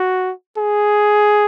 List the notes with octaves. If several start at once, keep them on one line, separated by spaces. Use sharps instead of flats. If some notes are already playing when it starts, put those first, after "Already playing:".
Already playing: F#4
G#4